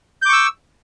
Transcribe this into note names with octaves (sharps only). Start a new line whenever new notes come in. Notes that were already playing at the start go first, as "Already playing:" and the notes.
C#6 D6 E6 G6